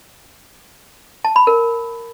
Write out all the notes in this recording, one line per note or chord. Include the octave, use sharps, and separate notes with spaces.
A5
B5
A#4